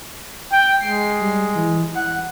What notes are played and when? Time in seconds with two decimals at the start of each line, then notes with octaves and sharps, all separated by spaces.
0.52 G5
0.80 G#3 C7
1.21 G3
1.55 E3
1.95 F#5